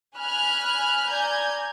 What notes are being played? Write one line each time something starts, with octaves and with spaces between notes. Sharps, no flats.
G#5 B5 F6 F#6
D5 G#5 A#5 G6 G#6